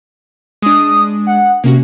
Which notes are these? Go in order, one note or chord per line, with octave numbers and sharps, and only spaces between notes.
G#3 D4 D#6
F#5
C3 A#3 C#4 F#4